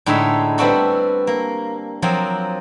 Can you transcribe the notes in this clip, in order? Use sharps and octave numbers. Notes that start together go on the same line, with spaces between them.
A2 D3 G#3 D#4 A4 E5
G3 B3 C4 D4 F#4 A4
A#3
F3 F#3 A#3 C4 F4